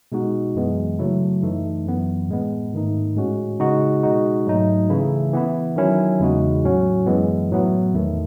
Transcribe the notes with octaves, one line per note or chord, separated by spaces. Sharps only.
B2 G#3 D#4 F#4
F#2 E3 G#3 B3
C#3 F#3 A3 E4
F#2 E3 A3 D#4
F#2 E3 B3
A2 G#3 B3
G#2 D#3 A3 D#4
A2 G#3 C#4 F#4
C#3 G#3 D#4 F#4
B2 G#3 D#4 F#4
G#2 F#3 A3 D#4
C#3 E3 A3 E4
E3 B3 E4
D#3 F#3 C#4 E4
E2 C#3 G#3 D#4 F#4
A2 F#3 C#4 F#4
F#2 E3 G#3 B3
A2 F#3 B3 E4
E2 D#3 A3